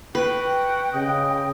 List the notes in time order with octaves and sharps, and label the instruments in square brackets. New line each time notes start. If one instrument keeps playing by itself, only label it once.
[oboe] F#4 [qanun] B4 [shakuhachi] G5
[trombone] C#3 [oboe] D#5